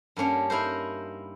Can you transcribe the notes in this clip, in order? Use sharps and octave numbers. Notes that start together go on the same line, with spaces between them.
G2 A#3 C#4 D4
D#4 E4 A#4 C5